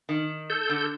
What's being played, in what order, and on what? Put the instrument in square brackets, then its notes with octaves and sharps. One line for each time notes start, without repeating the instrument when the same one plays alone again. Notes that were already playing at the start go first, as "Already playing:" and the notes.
[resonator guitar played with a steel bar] D#3
[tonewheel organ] A4 G6
[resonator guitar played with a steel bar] D3